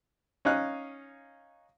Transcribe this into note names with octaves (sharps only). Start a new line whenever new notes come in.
C#4 D#4 F5 F#6